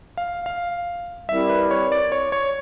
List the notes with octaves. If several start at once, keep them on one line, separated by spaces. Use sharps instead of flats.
F5
F5
G3 C4 E4 G4 A#4 E5
B4
C#5
D5
C#5
C#5